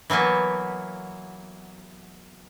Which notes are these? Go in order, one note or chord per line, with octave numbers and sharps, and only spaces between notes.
E3 F#3 A#3 B3